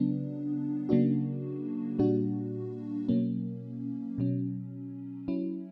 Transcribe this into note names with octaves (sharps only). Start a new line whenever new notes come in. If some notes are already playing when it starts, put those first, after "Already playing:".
Already playing: C#3 F#3 B3 D4
C#3 F#3 A#3 D4 F#4
A#2 G3 A#3 D4 F#4
B2 F#3 A#3 C#4
B2 F#3 C#4
F#3 C#4 E4